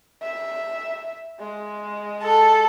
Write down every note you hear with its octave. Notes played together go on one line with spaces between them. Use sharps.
E5
G#3
A4